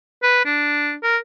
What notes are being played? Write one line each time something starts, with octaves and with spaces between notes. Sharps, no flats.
B4
D4
A#4